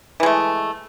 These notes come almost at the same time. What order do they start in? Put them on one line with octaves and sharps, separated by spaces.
E3 G#3 A3